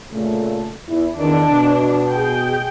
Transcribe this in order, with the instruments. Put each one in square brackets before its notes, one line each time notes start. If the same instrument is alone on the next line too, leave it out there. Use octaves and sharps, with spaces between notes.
[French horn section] A#2 C#3 A3
E2 E4
[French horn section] E2 D#3 [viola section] D4
[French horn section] B2
[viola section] G#4 G5